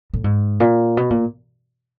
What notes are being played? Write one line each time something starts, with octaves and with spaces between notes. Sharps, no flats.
A2
G#2
A#2
B2
A#2